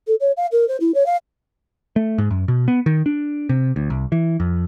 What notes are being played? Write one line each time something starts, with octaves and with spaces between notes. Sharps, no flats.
A4
C#5
F5
A#4
C5
E4
C#5
F5
A3
G#2
F#2
B2
B3
D#3
D4
C3
D2
C2
E3
F2